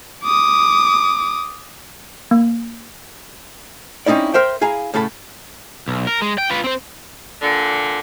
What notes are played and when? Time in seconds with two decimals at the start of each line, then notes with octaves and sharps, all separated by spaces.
0.24 D6 D#6
2.31 A#3
4.06 C4 C#4 D#4 E4 D5
4.34 A#4 C5 E5 G5
4.61 E4 G#4 F5 G#5 A#5
4.94 A2 C#3 A4 A5 B5
5.88 B1
6.07 A#4
6.22 G#3
6.38 G5
6.50 F4 B4
6.64 C4 C5
7.41 A#2 D3